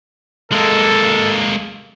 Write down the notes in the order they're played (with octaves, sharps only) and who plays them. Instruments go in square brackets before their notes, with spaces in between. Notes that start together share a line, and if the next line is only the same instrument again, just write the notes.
[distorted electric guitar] G#3 A#3 [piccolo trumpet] A4